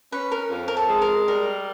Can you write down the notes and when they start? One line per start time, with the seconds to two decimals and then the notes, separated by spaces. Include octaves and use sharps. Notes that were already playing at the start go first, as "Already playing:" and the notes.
0.12 C#4 B4
0.32 A#4
0.51 F2
0.68 A#4
0.77 A4
0.89 G#3
1.02 A#4
1.28 G3 A#4